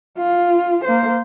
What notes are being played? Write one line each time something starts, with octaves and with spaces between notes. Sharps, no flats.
F4
A#3 C5